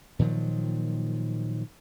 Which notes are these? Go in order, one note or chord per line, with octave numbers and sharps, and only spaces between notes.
A#2 D#3 F3 F#3